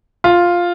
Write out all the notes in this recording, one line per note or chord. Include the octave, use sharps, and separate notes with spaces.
F4